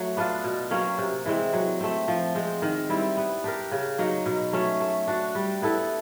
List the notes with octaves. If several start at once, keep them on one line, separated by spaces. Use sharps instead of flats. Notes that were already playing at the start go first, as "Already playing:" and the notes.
Already playing: F#3 A3
B3 D4 F4
B2
F#3 A#3 C#4
C3
E3 G#3 C4
F#3
A3 C4
F3
G#3 C4
D#3
G3 C4 E4
B3
D4 G4 A#4
C#3
F#3 A#3 D#4
B2
F#3 A3 C#4
A3
D4 F#4
G3
B3 E4 A4